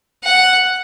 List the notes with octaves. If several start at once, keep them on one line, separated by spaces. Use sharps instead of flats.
F#5